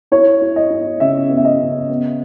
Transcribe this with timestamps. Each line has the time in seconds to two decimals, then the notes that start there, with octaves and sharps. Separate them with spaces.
0.12 E4 C#5
0.42 E4
0.56 D#5
0.70 E4
1.00 C#3 E5
1.30 B3
1.37 E5
1.45 D#5
1.60 C#3
1.89 B3